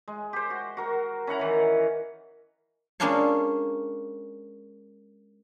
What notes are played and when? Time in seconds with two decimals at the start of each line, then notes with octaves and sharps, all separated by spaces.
0.08 G#3
0.33 G4 C5
0.50 F#4
0.77 F#4 A#4
1.27 C#4 E4 F#5 A#5
1.39 D#3 E3
3.00 G#3 A#3 C#4 D4 F4 C#5